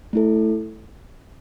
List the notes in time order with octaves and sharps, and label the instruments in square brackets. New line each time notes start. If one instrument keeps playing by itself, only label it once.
[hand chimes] A3 E4 A4